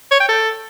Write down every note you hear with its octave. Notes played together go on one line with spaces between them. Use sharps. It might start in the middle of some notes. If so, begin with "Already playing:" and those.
C#5
G5
A4